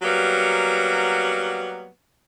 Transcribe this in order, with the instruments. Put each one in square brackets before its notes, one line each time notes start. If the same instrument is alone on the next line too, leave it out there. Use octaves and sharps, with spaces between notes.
[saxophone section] F#3 G3 A#3 B3